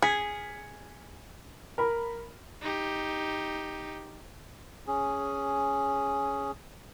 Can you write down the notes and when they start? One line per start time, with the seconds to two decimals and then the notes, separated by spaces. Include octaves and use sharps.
0.02 G#4 G#6 B6 C#7
1.78 A#4 B5
2.62 D#4 G4
4.87 C#4 G#4